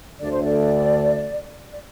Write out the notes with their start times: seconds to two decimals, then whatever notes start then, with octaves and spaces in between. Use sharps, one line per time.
0.21 D2 D3 A3 D5
0.32 C5
0.43 D5
1.73 D5